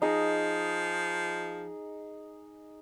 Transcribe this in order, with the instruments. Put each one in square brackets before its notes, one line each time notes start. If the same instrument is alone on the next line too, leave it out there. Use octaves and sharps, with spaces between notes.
[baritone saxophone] F3 [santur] D#4 G#4